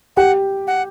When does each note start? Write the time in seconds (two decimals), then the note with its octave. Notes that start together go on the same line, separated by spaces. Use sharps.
0.17 G4 F#5
0.67 F#5